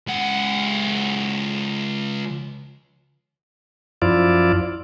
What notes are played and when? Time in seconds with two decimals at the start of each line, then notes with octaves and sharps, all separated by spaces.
0.07 C#2 F#5
4.02 F#2 F3 E4 F4 D5